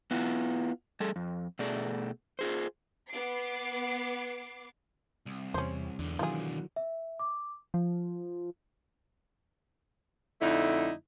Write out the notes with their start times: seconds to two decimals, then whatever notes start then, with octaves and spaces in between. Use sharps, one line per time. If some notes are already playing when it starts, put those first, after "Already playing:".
0.11 B3 E4 F4
1.00 G3 G#4 A4
1.16 F2
1.59 B2 A3 G#4 D5
2.39 F4 G#4 C5
3.08 B3 D6 C7
5.26 C2
5.54 E2 C3 C#4 C5
5.99 B1 E2 D3
6.19 D#3 E3 F#3 F4 G#4
6.76 E5
7.19 D6
7.74 F3
10.42 F2 D3 A3 D#4 E4